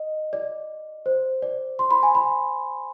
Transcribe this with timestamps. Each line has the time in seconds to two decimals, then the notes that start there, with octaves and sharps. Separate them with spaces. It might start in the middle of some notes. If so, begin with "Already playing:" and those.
Already playing: D#5
0.33 D5
1.06 C5
1.42 D5
1.79 C6
1.91 B5
2.03 G#5
2.15 B5